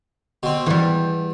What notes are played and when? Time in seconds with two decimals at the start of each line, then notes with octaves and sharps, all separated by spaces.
0.43 B2 C4
0.66 E2 E3 G3